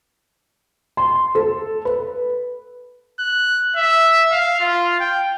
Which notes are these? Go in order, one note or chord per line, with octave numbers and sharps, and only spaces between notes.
C6
A4
B4
F#6
E5
F5
F4
G5